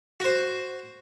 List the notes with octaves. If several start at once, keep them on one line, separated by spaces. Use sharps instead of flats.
F#4 C5